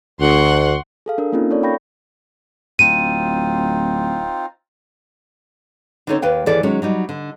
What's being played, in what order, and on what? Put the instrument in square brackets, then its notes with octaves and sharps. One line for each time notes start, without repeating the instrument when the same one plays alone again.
[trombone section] D2 [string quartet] F#5 C6 C#6
[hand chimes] G#4 A4 F5
D4 A#4 F5
A#3 C4 C#4 D#4 F4 A#4
A4 C#5 D5
F5 G5 B5 C#6 G6 A#6
[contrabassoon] D1 [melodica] C4 D#4 F4 [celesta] D#7
[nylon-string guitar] D3 C4 C#4 D#4 A4 C#5
D#2 B4 F5 G5
D#2 E3 G#4 A4 D5
D#3 F#3 G#3 C#4
F#3 G3 D#4
D3